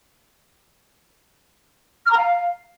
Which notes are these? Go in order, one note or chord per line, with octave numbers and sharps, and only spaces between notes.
F6
A#5
F5